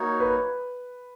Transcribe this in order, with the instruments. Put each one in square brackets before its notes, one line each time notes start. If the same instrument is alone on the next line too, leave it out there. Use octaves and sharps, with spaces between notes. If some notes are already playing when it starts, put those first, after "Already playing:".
Already playing: [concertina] A#3 D#4 F#4 C#5
[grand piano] B4